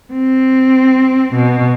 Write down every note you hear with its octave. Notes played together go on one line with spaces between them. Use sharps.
C4
B2